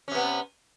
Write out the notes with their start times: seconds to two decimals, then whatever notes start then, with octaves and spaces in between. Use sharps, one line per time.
0.08 C#4
0.11 C3
0.15 B3